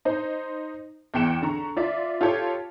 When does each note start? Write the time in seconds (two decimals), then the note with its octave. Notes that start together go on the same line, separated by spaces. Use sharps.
0.05 D#4 C5
1.14 E2 E3 G5 C#7 E7
1.43 D3 A#5 C#6
1.77 F4 D5 E5
2.21 F4 G4 A4 C#5